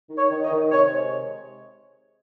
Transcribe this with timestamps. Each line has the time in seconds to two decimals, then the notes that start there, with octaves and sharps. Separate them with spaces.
0.10 D#3
0.17 C#5
0.31 D#3
0.44 D#5
0.51 D#3
0.71 C3 C#5
0.92 G#3